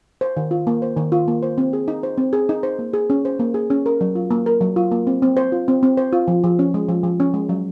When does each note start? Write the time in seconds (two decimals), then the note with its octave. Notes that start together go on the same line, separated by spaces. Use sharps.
0.21 C5
0.37 D#3
0.51 F4
0.67 A#3
0.82 C5
0.97 D#3
1.12 F4
1.28 A#3
1.43 C5
1.58 C4
1.73 G#4
1.88 D#4
2.03 C5
2.18 C4
2.33 G#4
2.49 D#4
2.63 C5
2.79 A#3
2.93 G#4
3.10 C#4
3.25 C5
3.39 A#3
3.54 G#4
3.70 C#4
3.86 A#4
4.01 F#3
4.15 F4
4.31 A#3
4.46 A#4
4.61 F#3
4.76 F4
4.91 A#3
5.07 C4
5.22 C4
5.37 C5
5.52 F4
5.68 C4
5.83 C4
5.97 C5
6.13 F4
6.28 F3
6.44 F3
6.59 C#4
6.74 G#3
6.89 F3
7.03 F3
7.20 C#4
7.34 G#3
7.49 F#3